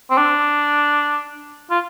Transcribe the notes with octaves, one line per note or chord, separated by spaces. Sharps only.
C4
D4
F4